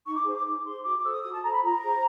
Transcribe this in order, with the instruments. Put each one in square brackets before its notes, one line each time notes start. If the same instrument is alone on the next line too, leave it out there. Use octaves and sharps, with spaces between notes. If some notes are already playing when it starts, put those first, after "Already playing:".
[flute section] D#4 C#6
D6
G#4 C5
D6
D#4 D6
G#4 C5 C6
F#4 D6
D6
A4 C5 E6
D#6
F#4 D#6
A5
A4 C5 A#5
B5
F4 A#5
G#4 C5